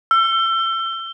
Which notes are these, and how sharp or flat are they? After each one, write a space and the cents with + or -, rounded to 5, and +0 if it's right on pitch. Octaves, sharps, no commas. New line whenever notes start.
E6 +30